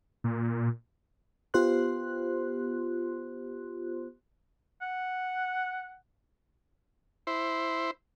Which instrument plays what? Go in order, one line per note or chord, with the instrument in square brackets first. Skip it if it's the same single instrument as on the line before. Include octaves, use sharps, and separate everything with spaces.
[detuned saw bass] A#2
[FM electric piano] B3 F4 G4 C5 C6 F#6
[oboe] F#5
[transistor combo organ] E4 C5